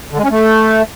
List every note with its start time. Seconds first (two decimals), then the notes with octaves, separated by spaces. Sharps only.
0.12 D3
0.18 G#3
0.24 C#4
0.30 A3